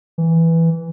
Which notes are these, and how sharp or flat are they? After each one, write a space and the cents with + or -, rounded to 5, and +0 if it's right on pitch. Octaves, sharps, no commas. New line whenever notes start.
E3 +0